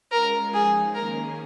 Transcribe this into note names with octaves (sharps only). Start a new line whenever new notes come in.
G#3 C#4 F4 A#4
F3 G#3 D#4 G#4
D#3 A#3 C#4 G#4 A#4